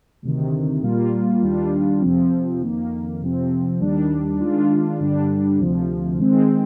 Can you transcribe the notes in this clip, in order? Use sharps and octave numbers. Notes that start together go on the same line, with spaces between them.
D2 C3 D#3
A#2 G3 A#3 F4
D#2 D#3 G3 D4 F4
F2 C3 F3 C4
F2 D#3 A#3
F2 C3 F3 C4
D#2 D#3 G3 D4
D#3 G#3 D4 F4
G2 D3 G3 D4
D2 C3 F3
D#3 G#3 C4